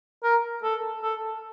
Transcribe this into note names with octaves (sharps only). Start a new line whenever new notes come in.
A#4
A4
A4